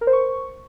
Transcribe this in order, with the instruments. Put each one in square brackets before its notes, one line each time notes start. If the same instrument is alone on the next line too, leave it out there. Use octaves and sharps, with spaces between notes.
[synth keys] A#4
C5
C#6